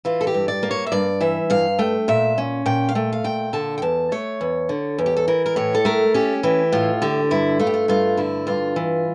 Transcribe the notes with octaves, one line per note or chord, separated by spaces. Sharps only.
E3 F4
A4
G4
G2
D5
A#3
C#5
E5
G2 D5
E3 E5
G2 F5
A3 G5
A#2 E5
C#4
A#2 G5
F5
A3 G5
F5
A#2 G5
D3 A5
G5
E2 A5
A3 C#5
E2
D3
E2
G4
A4
E3 A#4
A#4
A2 C#5
A4
A3 A#4
C#4 G4
E3 G4
A2 F4
D3 G4
G2 E4
A3 F4
G4
F4
G2 F4
D3 E4
G2 F4
E3